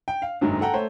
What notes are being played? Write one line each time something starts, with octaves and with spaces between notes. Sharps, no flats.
G5
F5
F#1 G#2 D3 D#3 F#3 D#4
A4 F#5 G5 A#5
A3 C5 C#5